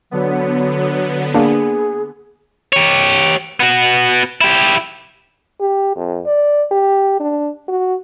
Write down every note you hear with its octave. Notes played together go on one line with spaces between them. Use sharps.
D3 F#3 B3
A#3 D4 G#4
G4 C#5
B3 F#4
E4 G4
G4
F2
D5
G4
D4
F#4